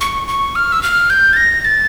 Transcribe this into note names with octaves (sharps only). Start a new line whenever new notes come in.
C#6
C#6
F6
E6
F6
G6
A6
A#6
A6